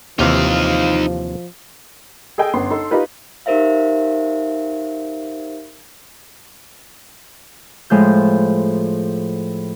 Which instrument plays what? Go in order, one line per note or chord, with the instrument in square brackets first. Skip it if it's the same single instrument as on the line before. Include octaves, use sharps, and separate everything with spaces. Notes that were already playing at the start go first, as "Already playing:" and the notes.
[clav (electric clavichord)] D#2 C3 E3 [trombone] F3 [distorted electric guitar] D#4 F5
[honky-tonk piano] G#4 A4 D#5 G5 G#5
G1 F#2 B3 C6
D#4 A4 C6
D#4 F4 G4 B4
[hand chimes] D#4 G4 A#4 C5 E5 F5
[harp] A2 F3 G#3 G6